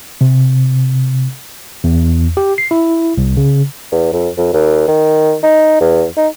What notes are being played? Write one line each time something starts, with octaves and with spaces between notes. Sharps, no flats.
C3
E2
G4
C7
E4
C2
C#3
E2
F2
F2
D#2
D#3
D#4
E2
D#4